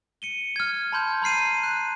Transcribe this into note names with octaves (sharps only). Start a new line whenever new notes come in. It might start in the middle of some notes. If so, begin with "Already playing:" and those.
C#7 D#7 G7
F6 G#6
A5 B5 C6 G6 G#6
A#5 B5 F6 C7 D#7
F#6